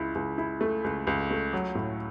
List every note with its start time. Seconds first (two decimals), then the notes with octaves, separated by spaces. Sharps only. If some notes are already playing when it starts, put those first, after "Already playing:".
Already playing: C#2 E4
0.15 C#2
0.38 E4
0.61 A3
0.84 C#2
1.07 C#2
1.31 A3
1.53 F#3
1.75 A2